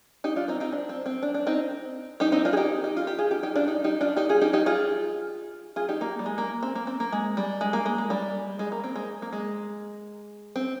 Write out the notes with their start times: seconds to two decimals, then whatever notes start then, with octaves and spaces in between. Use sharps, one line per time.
0.24 D#4 G4
0.36 D4 F4
0.48 C4 D#4
0.60 C4 D#4
0.72 D4
0.89 C4
1.06 C4
1.23 D4
1.34 D4
1.47 C4 D#4
2.20 D#4 G4
2.32 C4 D#4
2.45 D4 F4
2.53 G#4
2.57 D#4 G4
2.84 D#4
2.97 F4
3.07 G4
3.19 F4 G#4
3.31 D#4 G4
3.43 D#4 G4
3.55 D4 F4
3.68 D#4 G4
3.84 D#4 G4
4.01 D4 F4
4.16 D#4 G4
4.29 F4 G#4
4.41 D#4 G4
4.53 D#4 G4
4.66 F4 G#4
5.76 F4 G#4
5.89 D#4 G4
6.01 A#3
6.19 G3
6.26 G#3
6.38 A#3
6.63 C4
6.75 A#3
6.87 C4
7.00 A#3
7.13 G#3
7.37 G3
7.61 G#3
7.73 A#3
7.86 G#3
7.98 G#3
8.10 G3
8.59 G#3
8.72 A#3
8.84 C4
8.96 G#3
9.22 A#3
9.33 G#3
10.56 C4